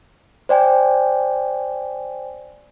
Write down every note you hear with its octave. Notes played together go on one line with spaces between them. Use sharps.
C5 D5 G5 G#5